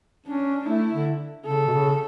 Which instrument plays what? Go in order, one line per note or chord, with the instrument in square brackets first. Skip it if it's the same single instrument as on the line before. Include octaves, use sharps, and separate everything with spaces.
[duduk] C#4 [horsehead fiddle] D4
[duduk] A3 [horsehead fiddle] E4
[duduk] D3
[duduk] C#3 [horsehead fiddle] A4
[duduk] B2
C#3